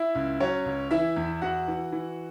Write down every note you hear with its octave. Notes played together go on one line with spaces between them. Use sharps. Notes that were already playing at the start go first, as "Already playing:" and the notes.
Already playing: E4 E5
C#2
F#3 C#4 C#5
C#2
E3 E4 E5
E2
E2 F#4 F#5
E3
E3